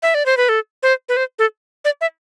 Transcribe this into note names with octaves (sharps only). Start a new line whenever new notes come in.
E5
D5
C5
B4
A4
C5
B4
C5
A4
D5
E5